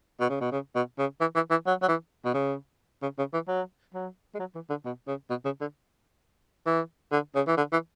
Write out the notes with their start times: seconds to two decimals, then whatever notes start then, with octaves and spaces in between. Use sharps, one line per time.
0.20 B2
0.29 C#3
0.41 B2
0.52 C#3
0.75 B2
0.98 C#3
1.20 E3
1.35 E3
1.51 E3
1.66 F#3
1.82 F#3
1.88 E3
2.25 B2
2.34 C#3
3.02 C#3
3.18 C#3
3.33 E3
3.47 F#3
3.94 F#3
4.34 G#3
4.39 F#3
4.55 E3
4.69 D3
4.85 B2
5.07 C#3
5.30 B2
5.45 C#3
5.61 D3
6.66 E3
7.12 D3
7.35 C#3
7.47 E3
7.57 D3
7.72 E3